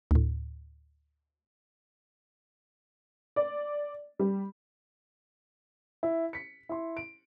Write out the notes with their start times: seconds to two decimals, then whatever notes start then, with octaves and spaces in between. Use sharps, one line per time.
0.11 D2 A2
3.36 D5
4.19 G3
6.03 E4
6.33 B6 C#7
6.69 E4 C6
6.97 D7